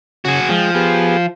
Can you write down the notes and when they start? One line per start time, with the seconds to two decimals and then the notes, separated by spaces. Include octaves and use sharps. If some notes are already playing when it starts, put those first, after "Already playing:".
0.25 C#3 F#4 G#4
0.49 F3 G#3 G5
0.75 B3 G4 G#4